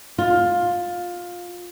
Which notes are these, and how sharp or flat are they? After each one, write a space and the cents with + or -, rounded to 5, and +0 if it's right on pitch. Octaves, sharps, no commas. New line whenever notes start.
F4 +15